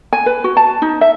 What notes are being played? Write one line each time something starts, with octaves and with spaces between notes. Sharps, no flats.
G#5
B4
F#4
A5
D#4
E5